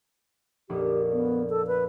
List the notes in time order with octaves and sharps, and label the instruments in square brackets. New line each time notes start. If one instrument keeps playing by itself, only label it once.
[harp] A#1 F2 D5 [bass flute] G4
[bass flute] B3
A4
B4